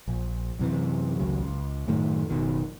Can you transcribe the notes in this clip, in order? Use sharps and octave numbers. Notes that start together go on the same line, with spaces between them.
A#1
F#2 C3 E3
G#1 C#2 C#3 F#3
C#2
F#2 A2 D#3 A3
F#1 B2 D#3